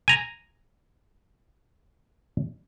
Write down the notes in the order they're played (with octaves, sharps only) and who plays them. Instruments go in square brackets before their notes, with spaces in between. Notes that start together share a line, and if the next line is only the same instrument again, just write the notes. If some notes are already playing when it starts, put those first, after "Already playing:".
[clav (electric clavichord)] G#5 A#5